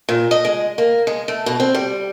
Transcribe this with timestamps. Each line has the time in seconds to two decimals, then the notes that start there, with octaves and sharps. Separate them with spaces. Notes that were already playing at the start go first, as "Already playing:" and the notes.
0.09 A#2
0.31 D#5
0.45 G#3
0.78 A#3
1.07 G#3
1.28 A3
1.46 B2
1.60 C4
1.74 G3